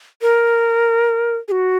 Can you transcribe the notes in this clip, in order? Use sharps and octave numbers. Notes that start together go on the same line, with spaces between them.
A#4
G#4
F#4